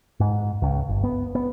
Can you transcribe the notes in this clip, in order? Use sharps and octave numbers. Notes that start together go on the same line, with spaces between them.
G#2
C#2
G1
B3
B3